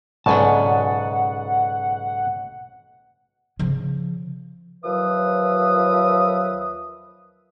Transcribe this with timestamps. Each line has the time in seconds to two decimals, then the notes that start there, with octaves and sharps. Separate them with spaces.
0.26 B1 G#2 C#3 D5 F#5 G#5 A5
3.59 C#3 F3
4.85 D#2 F3 F#3 B4 E5 D#6